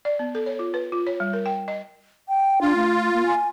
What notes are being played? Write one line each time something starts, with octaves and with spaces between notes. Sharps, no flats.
D5
B3
A4
C#5
F4
B4
F4
C#5
G3
A#4
G5
D#5
G5
D4 F4
A3
A#3
G#5